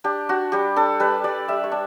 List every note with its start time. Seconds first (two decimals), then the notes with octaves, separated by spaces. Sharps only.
0.04 D4 G4
0.29 D4 F#4
0.52 G3 G4
0.76 D4 A4
1.00 G3 B4
1.24 G3 D5
1.48 G3 E5
1.64 C#5
1.72 D4